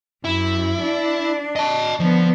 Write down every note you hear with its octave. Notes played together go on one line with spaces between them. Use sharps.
F#2 E4
D4
D#5 A5
D3 F3 B3